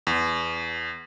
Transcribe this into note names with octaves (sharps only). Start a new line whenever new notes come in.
E2